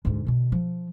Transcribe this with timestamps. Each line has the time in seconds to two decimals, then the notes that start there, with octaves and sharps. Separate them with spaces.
0.05 D2 G#2
0.26 B2 D3
0.52 F3